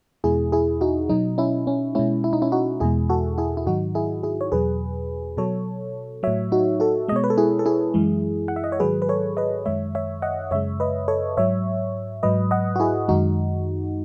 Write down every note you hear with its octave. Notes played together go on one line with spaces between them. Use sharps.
E2 B2 G#3 E4 G#4
E4 G#4
D#4 F#4
B2 F#3 D#4
C#4 E4
C#4
B2 G#3 C#4 E4
E4
D#4
C#4 E4
D#4 F#4
E2 B2 G#3 E4 G#4
F#4 A4
E4 G#4
E4
G#2 D#3 F#3 D#4 F#4
E4 G#4
E4 G#4
C#5
E2 B2 F#3 G#4 B4
B2 F#3 A4 C#5
A2 F#3 C#5 E5
D#4 F#4
F#4 A4
B2 G#3 C#5 D#5
B4
A4
E4 G#4
A4
E4 G#4
F#2 E3 G#3
F#5
E5
D#5
C#5
G#2 D#3 F#3 G#4 B4
B4
A4 C#5
B4 D#5
F#2 D#3 G#3 C#5 E5
C#5 E5
D#5 F#5
F#2 C#3 G#3 C#5 E5
B4 D#5
A4 C#5
G#2 F#3 C#5 E5
G#2 F#3 B4 D#5
D#5 F#5
F#4
E4 G#4
F#2 D#3 G#3 D#4 F#4